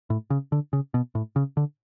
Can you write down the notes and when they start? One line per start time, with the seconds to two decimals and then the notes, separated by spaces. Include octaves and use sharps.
0.10 A2
0.30 C#3
0.52 D3
0.73 C#3
0.94 B2
1.15 A2
1.36 C#3
1.57 D3